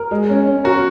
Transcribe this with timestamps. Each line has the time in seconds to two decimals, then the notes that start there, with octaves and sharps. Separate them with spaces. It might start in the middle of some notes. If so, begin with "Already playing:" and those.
Already playing: A#4
0.11 G#3
0.29 C#4
0.47 C#4
0.64 F#4 A#4